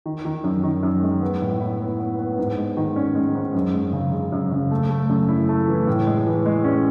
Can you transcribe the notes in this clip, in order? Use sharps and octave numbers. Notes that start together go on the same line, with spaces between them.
D#3
D#3
F#2
D#3
F#2
G#3
B3
A2
E4
B3
B3
B3
G#2
G#3
D#3
C#4
G#3
G#2
F#2
G#3
C#3
C#3
F#2
C#3
A3
A3
F#2
E4
A3
E3
A2
G#3
E3
G#3
C#4